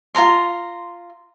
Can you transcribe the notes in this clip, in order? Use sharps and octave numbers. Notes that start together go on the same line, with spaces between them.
F4 A#4 A#5 C6